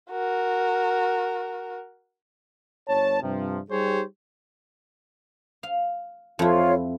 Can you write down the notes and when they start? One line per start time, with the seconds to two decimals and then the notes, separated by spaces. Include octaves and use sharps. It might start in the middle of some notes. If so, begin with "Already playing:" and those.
0.11 F#4 A#4
2.88 G1 C#5 A5
3.22 G2 C3 F3
3.70 G3 D#4 G4 G#4 C5 C#5
5.63 F5
6.39 F2 E4 F4 C#5